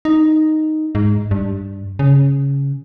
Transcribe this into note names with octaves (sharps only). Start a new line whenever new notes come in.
D#4
G#2
G2
C#3